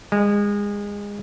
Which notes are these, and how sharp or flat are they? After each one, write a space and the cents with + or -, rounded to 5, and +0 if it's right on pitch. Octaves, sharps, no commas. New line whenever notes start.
G#3 -25